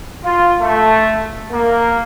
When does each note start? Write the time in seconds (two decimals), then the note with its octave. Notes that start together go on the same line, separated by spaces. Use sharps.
0.24 F4
0.61 A3
1.51 A#3